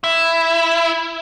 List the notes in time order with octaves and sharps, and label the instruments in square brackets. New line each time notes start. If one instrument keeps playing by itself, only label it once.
[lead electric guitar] E4